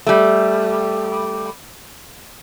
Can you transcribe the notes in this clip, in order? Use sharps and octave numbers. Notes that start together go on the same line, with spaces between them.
G3 A3